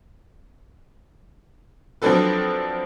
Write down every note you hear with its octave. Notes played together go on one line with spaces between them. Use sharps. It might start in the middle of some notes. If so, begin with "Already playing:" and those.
F3 F#3 C4 D4 A4 B4